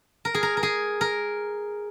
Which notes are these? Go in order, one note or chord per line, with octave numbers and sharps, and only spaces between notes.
A#4
G#4
A#4
A#4
G#4
A#4